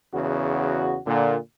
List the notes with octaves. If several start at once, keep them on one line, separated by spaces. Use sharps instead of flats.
E2 C#3 F#4
A#2 D3